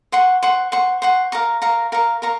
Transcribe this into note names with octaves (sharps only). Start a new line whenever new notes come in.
C5 F#5 C#6
C5 F#5 C#6
C5 F#5 C#6
C5 F#5 C#6
A#4 F5 A#5 C#6
A#4 F5 A#5 C#6
A#4 F5 A#5 C#6
A#4 F5 A#5 C#6